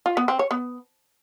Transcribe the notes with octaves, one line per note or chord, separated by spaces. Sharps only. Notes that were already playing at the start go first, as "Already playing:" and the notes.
F4
B3
C4
C#5
B3